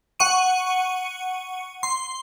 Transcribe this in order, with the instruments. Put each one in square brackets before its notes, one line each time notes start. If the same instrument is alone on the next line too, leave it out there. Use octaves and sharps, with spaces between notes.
[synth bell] F#5 C#6 D#7
C6